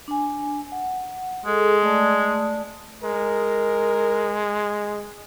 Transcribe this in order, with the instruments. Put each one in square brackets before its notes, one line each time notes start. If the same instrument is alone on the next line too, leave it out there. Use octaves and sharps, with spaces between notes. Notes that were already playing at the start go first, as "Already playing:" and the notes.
[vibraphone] D4 G#5
F#5
[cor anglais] G#3 [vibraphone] G#4 A4
[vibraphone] A3 D5 A5
[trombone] G#3 [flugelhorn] A#4